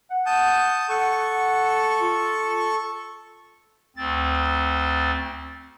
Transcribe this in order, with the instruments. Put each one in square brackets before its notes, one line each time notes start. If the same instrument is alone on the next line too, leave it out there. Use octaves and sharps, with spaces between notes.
[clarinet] F#5
[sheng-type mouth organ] A5 D#6 G6
[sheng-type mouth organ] A4 C#6 [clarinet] F#5
[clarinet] F4
[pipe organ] D2 C4 A6